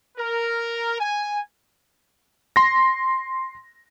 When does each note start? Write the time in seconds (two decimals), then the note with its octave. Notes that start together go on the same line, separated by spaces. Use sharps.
0.18 A#4
0.99 G#5
2.56 C6 A#6